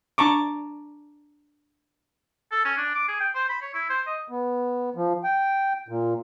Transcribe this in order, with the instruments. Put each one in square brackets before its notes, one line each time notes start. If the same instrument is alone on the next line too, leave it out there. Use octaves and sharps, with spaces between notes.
[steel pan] D4 A5 A#5 C#6 D6
[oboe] A4
C#4
D4
D6
G#4
G5
C5
B5
C#5
E4
C5
D#5
[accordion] B3
F3
G5
A#2